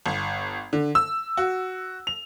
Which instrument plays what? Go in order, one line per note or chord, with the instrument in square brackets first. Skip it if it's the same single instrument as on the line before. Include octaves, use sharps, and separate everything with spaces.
[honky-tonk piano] G1
D3
E6
F#4
F7